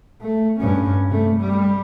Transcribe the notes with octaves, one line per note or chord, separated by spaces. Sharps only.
A3
G2 C#4
C3 A3
G3